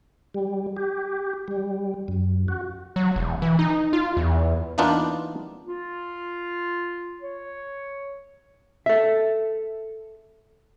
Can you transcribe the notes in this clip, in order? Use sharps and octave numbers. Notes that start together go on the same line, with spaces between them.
G3
G4
G3
F#2
F#4
F#3
E1
E3
D#4
F4
E2
E3 A#3 B3 D4 D#4 F4
F4
C#5
A4 E5